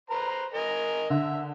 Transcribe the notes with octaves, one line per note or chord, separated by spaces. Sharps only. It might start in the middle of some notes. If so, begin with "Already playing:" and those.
B4 C5 A#5
A#4 D#5 G#5
D3 E5